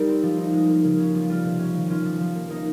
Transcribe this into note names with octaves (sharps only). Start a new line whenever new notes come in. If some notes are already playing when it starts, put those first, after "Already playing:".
Already playing: G3 D#4 G4 A#4
C4
F3
D#4
G#3
A#3
C#3
C#4
F3
G3 F4
C3
C#4
D#3
C#4 F4
F3
F3
A#3
A#3 D#4